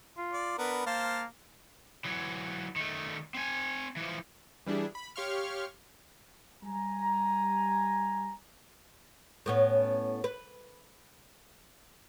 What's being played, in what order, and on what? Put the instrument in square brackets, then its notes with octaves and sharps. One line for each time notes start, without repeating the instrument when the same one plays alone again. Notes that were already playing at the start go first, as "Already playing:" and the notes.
[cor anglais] F4
[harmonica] D5
[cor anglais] B3 [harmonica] D4 A#4 B4
[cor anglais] A#3 [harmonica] C5 F5 A5
[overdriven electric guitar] E3 F#3
D#3 A3
C4 G#5
E3 F3
[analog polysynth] E3 G3 D4 E4 G#4
B5
G4 C#5 F5 C6 C#6 F6
[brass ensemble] G3 G#5 A#5
[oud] A2 B3 C#4
B4